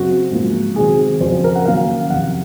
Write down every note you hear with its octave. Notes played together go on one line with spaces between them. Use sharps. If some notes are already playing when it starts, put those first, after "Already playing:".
Already playing: F#2 C#3 F#3 C4 F#4
G#2 F3 A#3
C3 D#3 F#3 C4 G#4
F2 C#3 F#3 C#4 C5
A#4
F#5
F#2 D#3 F#3 A#3 C#4 F5
F2 C3 D#3 F#5